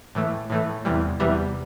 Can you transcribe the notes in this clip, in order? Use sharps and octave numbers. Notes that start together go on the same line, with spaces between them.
A2 E3 A3
A2 E3 A3
E2 C3 E3 G3
E2 C3 E3 G3